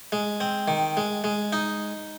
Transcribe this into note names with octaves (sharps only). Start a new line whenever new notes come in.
G#3
C4
D#3
G#3
G#3
D#4